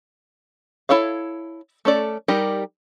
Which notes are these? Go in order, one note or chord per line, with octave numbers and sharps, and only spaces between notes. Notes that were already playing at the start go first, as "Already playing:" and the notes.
E4 A4 C#5 F5
A3 C#4 A4 D5
G3 D#4 G4 A#4